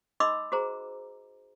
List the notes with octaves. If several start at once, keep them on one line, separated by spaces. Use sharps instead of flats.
D#4 D#5 B5 C6 D6 E6
F#4 G#4 C5 A#5